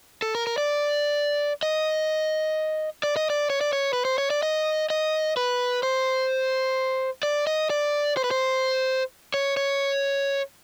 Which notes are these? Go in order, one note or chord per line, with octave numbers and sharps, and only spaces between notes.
A4
A#4
A#4
D5
D#5
D5
D#5
D5
C#5
D5
C#5
B4
C5
C#5
D5
D#5
D#5
B4
C5
D5
D#5
D5
C5
B4
C5
C#5
C#5